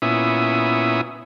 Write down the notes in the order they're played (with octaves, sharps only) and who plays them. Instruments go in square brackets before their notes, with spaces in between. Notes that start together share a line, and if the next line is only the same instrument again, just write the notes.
[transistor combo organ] A#2 B3 C#4 E4 E5 D#6